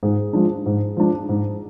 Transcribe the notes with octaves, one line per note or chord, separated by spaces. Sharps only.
G#2 G#4
F3 G#3 D4
G#2
F3 G#3 D4
G#2